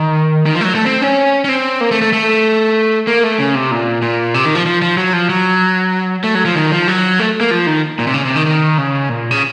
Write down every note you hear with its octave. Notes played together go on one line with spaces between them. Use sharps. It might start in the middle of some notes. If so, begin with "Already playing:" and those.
Already playing: D#3
D#3
F3
A3
F#3
A3
C4
C#4
C#4
C4
A#3
A3
A3
A3
A#3
A3
C#3
C3
A#2
A#2
C3
D#3
F3
F3
F3
F#3
F3
F#3
A3
F#3
F3
D#3
F3
F#3
A3
A#3
F3
D#3
A#2
C3
C#3
C3
D#3
D#3
C#3
A#2
C#3